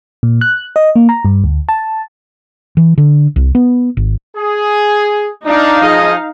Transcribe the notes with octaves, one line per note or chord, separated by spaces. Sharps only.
A#2
F#6
D#5
A#3
A#5
G2
D2
A5
E3
D3
C2
B3
G#1
G#4
D4 D#4 F5
F3 G#4 D#5